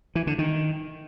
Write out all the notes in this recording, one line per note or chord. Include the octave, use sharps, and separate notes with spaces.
E3
D3
D#3